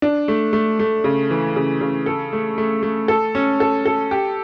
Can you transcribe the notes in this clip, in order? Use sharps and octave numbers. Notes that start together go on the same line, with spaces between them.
D4
A3
A3
A3
C#3
E3
C#3
C#3
A4
A3
A3
A3
A4
C#4
A4
A4
G4